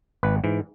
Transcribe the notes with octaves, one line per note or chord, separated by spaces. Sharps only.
G#1 B4
G#2 E3